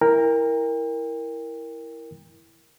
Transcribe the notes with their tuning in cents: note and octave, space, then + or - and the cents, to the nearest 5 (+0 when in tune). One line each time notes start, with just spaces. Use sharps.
E4 +0 A#4 +0 G5 +35